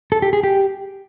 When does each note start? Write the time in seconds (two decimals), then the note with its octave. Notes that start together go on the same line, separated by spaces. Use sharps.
0.12 A4
0.22 G4
0.33 G#4
0.43 G4